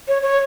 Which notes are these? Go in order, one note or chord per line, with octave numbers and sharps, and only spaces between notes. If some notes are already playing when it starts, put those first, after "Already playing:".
C#5
C#5